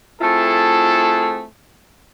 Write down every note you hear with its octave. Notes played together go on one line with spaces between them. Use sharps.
A3 C4 E4 F4 G#4 A4